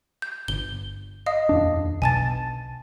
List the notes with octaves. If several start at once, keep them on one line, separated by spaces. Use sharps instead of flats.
G6
G1 G7
D#5 F5 D#6
D#1 F2 D4
B1 B2 G#5 A5 A6